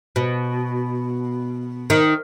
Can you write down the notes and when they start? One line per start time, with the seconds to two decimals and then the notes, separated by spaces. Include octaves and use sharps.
0.16 B2
1.90 D#3